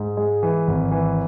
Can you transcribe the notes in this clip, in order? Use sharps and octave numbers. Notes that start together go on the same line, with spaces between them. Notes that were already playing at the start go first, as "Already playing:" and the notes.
Already playing: G#2
G#3
E3
G#1
E3